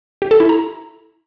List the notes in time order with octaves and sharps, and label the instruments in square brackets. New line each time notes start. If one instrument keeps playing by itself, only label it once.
[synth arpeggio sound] G4
A4
E4
A#5